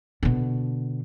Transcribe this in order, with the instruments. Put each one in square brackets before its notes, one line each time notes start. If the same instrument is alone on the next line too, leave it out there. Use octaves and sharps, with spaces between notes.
[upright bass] B2 D3